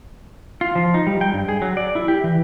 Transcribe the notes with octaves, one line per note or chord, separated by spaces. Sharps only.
F4
F3
D#4
G3
G5
G2
G#4
F#3
D5
E4
G4
E3